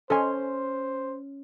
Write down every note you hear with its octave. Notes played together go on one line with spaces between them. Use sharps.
C#4 A4 C5 D#5 G#5 C6